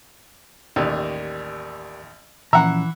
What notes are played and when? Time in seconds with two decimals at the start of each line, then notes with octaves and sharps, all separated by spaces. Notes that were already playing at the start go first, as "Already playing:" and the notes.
0.76 A1 D#2 G4 A#4 D5
2.53 A#2 E3 F3 C#4 E5 F#5 A#5